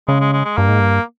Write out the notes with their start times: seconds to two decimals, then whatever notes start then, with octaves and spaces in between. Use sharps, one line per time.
0.08 C#3 G#3
0.21 G#3
0.33 G#3
0.45 G#3
0.57 G2 A#3
0.69 G#2
0.80 G2